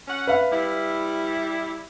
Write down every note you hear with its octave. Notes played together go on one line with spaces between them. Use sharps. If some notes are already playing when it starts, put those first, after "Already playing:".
C#4 F#4 F#5
B4 E5 F5
G3 E4